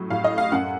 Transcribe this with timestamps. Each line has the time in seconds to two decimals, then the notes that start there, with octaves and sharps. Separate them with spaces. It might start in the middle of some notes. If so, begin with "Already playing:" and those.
Already playing: A2 F#3
0.10 A2 F5
0.24 D#5
0.32 A3
0.38 F5
0.52 F#2 F#5